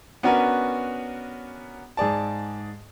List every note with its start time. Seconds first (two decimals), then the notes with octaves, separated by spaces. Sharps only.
0.23 B3 C#4 D4 F#4 A#4 B4
1.97 G#2 G#4 D5 A5